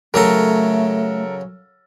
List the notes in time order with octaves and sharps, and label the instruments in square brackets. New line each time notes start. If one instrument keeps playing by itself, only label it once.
[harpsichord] C#3 F#3 A#5 [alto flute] A3 [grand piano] A4 A#4